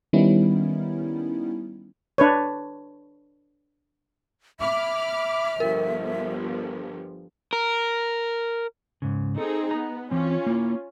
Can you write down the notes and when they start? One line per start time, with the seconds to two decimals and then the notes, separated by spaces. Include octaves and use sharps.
0.13 D#3 G3 B3 C#4 D#4 E4
2.18 D4 B4 C#5
4.60 E5 B5 D6 F6
5.60 G1 F3 A#4
7.53 A#4
9.02 G#2 C#3
9.38 C4 D#4 G#4 A4
9.71 B3 A#5
10.11 E3 C4 C#4 F4
10.46 A#3 E4